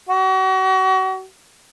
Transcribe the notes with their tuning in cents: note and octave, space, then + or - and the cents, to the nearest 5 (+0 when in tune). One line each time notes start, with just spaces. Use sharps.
F#4 +35